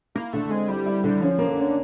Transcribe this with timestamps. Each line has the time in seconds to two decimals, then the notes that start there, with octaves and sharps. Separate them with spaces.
0.15 A#3 E4
0.33 D3 A3
0.50 G#3 C4
0.68 G3 E4
0.86 E4
1.04 D3
1.21 F3 C#4
1.39 A#3
1.48 D3
1.57 C#4